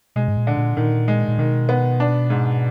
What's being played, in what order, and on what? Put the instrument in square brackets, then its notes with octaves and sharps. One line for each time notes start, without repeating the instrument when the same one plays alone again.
[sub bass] B2 [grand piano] G#3
[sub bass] G#2
A#2
[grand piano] D3
[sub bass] A#2
[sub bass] A#2 [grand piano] D#3
[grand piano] G#3
[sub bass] A#2
[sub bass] B2 [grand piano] D#3
[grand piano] B3
D4
G#2